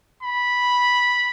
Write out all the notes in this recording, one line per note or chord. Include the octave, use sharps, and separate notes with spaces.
B5